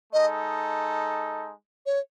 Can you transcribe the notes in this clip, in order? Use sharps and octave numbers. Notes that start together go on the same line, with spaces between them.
G#3 D#4 A4 D#5
C#5